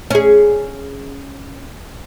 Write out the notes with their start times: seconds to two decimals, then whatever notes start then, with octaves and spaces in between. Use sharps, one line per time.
0.11 C#4 G#4